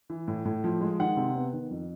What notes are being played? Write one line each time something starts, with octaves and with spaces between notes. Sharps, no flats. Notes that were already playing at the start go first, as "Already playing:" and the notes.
E3
A2
A2
F3
G#3
D#3 F#5
C3
B3
D#3
F2